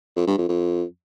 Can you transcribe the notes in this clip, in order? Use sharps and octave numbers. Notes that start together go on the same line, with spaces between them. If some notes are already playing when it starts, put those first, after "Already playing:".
F2
G2
F2
F2